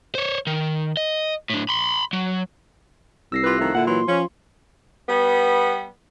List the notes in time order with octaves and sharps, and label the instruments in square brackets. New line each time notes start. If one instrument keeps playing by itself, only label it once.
[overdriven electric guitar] C5 C#5
D#3
D#5
A2 D4
B5 C6
F#3
[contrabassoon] C2 [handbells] E6 A#6 C7
[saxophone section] F4 G4 B4 [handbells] F#6
[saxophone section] D#3 F3 A3
[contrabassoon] A#2 [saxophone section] D3 E4 F#5
[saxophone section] E3 F#3 [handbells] C6
[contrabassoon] F3 [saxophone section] C#4
[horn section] G3 B3